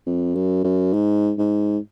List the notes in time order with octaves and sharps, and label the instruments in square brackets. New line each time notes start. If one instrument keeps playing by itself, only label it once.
[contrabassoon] F2
F#2
F#2
G#2
G#2